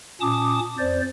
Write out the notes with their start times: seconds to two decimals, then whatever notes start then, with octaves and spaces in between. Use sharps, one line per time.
0.21 A#2 C#4 A5 D6 D#6
0.78 F2 C5 D5